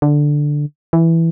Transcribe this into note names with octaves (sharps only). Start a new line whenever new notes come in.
D3
E3